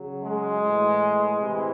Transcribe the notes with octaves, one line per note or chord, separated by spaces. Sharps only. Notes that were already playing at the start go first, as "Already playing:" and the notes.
Already playing: C#3 F#3
G#3
A2 E3
C3 E3